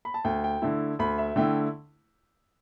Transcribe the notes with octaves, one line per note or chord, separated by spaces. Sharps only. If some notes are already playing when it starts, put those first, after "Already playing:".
B5
A5
D2 G5
G5
D3 A3 E4
D2 B5
E5
D3 A3 E4 G5